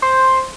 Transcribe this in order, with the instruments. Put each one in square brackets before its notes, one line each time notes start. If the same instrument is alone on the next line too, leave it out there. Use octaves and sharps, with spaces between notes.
[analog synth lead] C5